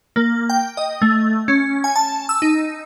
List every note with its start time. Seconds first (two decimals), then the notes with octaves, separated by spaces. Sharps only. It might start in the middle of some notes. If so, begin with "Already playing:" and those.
0.16 A#3
0.50 G5
0.77 D#5
1.02 A3
1.48 C#4
1.84 G#5
1.96 A5
2.29 E6
2.42 D#4